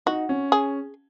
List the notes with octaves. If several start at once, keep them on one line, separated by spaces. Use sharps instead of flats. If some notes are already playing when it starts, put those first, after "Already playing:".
D#4 F#4
C#4
G#4